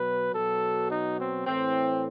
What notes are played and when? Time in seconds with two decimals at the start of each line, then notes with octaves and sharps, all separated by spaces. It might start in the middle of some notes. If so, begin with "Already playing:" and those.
Already playing: B2 F#3 B4
0.32 B2 F#3 A4
0.90 D#4
1.18 C4
1.46 A2 E3 C4